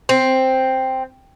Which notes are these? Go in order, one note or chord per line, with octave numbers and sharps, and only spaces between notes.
C4